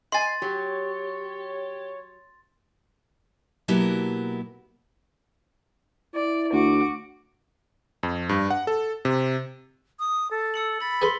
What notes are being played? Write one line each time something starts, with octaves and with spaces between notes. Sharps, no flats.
D#5 G#5 C6 A6 C7
F#3 G4 C#5
B2 F#3 A#3 B3 E4 G4
E4 D5
D2 F#4 D6
F2
G2
F#5
A4
C3
D#6
A4
E6 C#7 F#7
B5 A6 F#7
G#4 A4 B4 C6 B6 G7